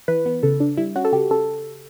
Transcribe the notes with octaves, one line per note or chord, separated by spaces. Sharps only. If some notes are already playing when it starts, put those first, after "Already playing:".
E3 B4
B3
C#3 A4
D4
G3 E4
C#4 F#4
A4
C#3 G4
C#3 A4